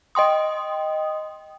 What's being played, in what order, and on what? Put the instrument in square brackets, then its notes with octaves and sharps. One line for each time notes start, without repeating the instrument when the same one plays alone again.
[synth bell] D#5 G5 C6 D#6